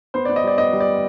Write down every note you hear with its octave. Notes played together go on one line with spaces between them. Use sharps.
B3 C5
D5
B3
D#5
G3 D5
B3 D#5
G3
D5